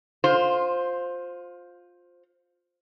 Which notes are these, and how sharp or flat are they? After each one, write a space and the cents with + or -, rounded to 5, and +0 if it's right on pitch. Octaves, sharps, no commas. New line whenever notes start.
F4 +20 C5 +0